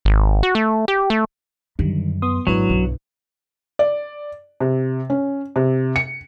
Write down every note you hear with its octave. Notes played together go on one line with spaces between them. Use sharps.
G#1
F#4
A3
G4
A3
F#2 D3 D#3 G3
B3 C6 D#6
G#1 F#3 D4 E4 B4
B1 G2
D5
C3
C#4
C3
C#7